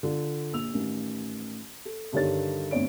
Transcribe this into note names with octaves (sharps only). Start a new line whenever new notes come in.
D3 F4
A#1 E6 F7
A1 D#3
A4
G2 D3 D#3 G3 C#5 A6
G#1 D2 B3 D4 C#5 D7